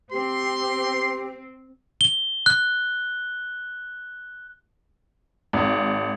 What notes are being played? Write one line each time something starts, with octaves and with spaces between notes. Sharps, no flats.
C4 G4 C6
G7
F#6
G#1